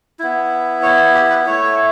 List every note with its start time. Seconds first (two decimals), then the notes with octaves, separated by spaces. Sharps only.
0.19 B3 E4
0.82 C#5
1.15 G4
1.30 B4
1.46 A3 E4 C#5